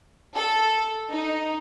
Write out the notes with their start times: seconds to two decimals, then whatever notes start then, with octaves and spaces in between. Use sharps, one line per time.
0.35 A4
1.11 D#4